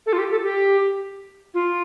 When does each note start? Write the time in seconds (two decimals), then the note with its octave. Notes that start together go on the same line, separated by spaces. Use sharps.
0.06 A4
0.13 F4
0.18 G4
0.31 A4
0.43 G4
1.54 F4